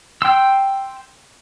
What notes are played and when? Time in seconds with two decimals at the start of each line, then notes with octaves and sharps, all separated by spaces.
0.22 G5 C6 E6